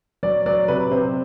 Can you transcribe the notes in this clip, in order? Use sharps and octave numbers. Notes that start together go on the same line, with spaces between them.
F#3 D5
F#3 D5
C3 B4
C3 C5